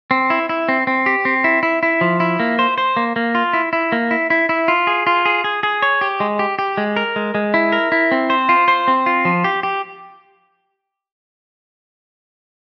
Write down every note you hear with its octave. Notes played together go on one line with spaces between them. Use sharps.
C4
E4
E4
C4
C4
G4
C4
E4
E4
E4
F3
E4
A#3
C5
C5
A#3
A#3
F4
E4
E4
A#3
E4
E4
E4
F4
G#4
F4
G#4
G#4
G#4
C#5
G4
G#3
G4
G4
G#3
A#4
G#3
G#3
E4
A#4
E4
C4
C5
F4
C5
C4
F4
F3
G4
G4